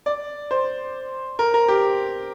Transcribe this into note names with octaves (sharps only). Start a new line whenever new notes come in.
D5
C5
A#4
A#4
G4